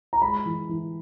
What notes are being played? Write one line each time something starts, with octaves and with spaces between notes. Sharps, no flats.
A#5
G#3 B5
E3
E3